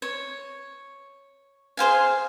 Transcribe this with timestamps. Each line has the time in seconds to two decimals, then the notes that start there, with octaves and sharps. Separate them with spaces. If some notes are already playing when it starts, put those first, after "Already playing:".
0.02 C#5
1.77 G#4 C5 F5 G#5